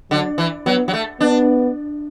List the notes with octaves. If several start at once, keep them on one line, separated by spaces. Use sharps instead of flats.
D3 F#3
E3
F#3 B3
F#3
A3
B3 D4